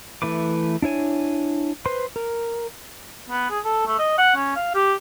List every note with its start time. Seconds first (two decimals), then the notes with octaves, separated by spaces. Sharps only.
0.22 E3 A3 B4 D6
0.82 D4 E4 C#5 G#5
1.86 B4 C5 C6
2.16 A#4
3.30 B3
3.50 G#4
3.64 A4
3.86 A3
3.99 D#5
4.18 F#5
4.36 C#4
4.56 F5
4.74 G4